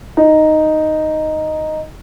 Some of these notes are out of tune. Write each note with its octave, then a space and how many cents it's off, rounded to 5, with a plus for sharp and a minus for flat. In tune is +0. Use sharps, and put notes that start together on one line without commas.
D#4 -5